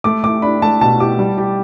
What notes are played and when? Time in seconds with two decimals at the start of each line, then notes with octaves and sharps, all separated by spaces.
0.04 A3 D6
0.24 A3 D6
0.42 D4 B5
0.62 A3 A5
0.81 B2 A5
1.00 G4 D6
1.19 G3
1.38 G4